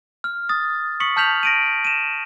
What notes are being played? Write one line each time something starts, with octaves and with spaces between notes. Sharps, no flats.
F6
D#6 A6
C#6 D#6 B6 C#7 F#7
A5 F6 G6 B6 F7 F#7
A#6 D7 D#7
D#7 E7